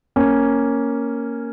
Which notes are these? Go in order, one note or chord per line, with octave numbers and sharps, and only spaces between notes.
A#3 C#4